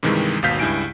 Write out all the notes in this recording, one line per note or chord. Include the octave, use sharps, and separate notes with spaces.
G2 C3 D#3 E3 G#3
G#1 D#2 B2 F5 G6 B6
C#2 G2 E4 G#5 D7